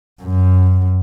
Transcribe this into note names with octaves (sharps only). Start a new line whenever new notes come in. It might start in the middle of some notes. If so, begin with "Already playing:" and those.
F#2